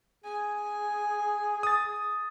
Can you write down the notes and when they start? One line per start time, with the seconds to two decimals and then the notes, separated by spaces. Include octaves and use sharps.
0.24 G#4 G#5
1.63 D#6 A6